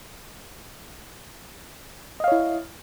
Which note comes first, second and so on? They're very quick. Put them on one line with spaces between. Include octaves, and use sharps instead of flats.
D#5 F5 C#5 E4